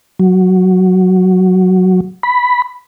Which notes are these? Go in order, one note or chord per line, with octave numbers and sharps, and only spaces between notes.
F#3
B5